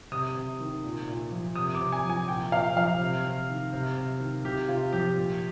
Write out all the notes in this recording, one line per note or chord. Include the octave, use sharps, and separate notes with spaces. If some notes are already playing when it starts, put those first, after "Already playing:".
C3 D#6
C3
D#3
A#2
A#2
F3
C3 D#6
D6
C3
G#5
F3
G#5
A#2 G5
A#2 F5
F3 F5
C3
C3
D#3
C3
C3
D#3
C3 G4
C3 F4
F3 G4
A#2